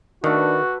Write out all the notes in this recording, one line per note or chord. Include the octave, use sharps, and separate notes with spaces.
D#3 A3 D4 F#4 B4 D6